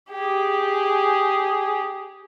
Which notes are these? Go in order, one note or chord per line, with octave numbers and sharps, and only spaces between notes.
G4 G#4